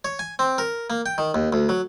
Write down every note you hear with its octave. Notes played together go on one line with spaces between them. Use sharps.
C#5
G#5
C4
A#4
A#3
G5
D#3
D#2
D2
F#3